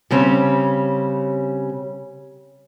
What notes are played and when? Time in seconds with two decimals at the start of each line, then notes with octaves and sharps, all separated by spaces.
0.11 C#3 G3 C4 C#4